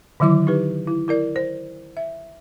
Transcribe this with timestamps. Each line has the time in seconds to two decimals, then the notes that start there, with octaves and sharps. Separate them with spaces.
0.20 D3 D#3 F#3 E4 D6
0.47 D#4 G4 B4
0.87 E4
1.08 E4 A#4 D5
1.36 C5
1.97 E5